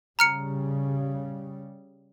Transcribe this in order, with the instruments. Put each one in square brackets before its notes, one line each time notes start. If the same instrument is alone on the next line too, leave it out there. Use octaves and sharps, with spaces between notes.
[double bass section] C#3 G3 [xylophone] A#5 F6 C#7